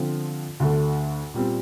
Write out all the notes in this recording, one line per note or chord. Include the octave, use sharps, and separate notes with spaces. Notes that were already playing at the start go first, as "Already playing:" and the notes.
Already playing: D3 F3 C4
D2 D3 A3
A#2 G3 C4